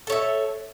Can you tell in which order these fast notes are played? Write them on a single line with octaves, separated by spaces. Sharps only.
A4 C#5 E5